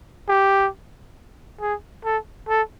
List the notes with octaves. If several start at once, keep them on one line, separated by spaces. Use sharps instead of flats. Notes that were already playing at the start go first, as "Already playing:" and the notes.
G4
G#4
A4
A4